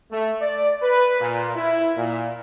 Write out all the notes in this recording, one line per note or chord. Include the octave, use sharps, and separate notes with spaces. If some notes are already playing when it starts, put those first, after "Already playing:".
A3
D5
B4
A#2
E4
A#2